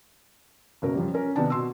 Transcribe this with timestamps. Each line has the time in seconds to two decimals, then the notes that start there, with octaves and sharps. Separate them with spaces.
0.82 F#1 B2 A#4
0.95 F#2 F3 G3
1.14 C#4 A#4
1.36 C3 D#3 B3 D4 A5
1.50 B2 C6 E6